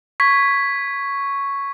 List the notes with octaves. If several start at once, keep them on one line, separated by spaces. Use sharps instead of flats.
C#6 G#6 B6